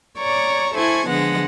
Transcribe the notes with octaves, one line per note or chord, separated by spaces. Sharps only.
C#5 D5 A#5 C#6
E4 A4 C5 G#5 C#6 G#6
D3 F3 G#3 B3 F#5 A#6